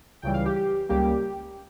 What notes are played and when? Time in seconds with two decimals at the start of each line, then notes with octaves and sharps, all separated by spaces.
0.22 C#2 C#3 E3 G3 G5
0.34 F5
0.46 G4
0.56 G4
0.89 C#2 C#3 G3 A#3 G4